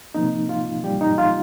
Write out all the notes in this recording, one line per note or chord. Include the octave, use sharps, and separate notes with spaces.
C3 F3 A#3 D#4
F4
G3 G4
D#4
F4